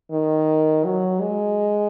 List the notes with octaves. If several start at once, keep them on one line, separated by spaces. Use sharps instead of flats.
D#3
F#3
G#3